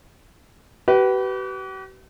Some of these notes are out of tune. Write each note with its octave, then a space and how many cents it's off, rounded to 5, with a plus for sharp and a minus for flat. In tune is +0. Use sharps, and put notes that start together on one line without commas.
G4 -45 B4 +0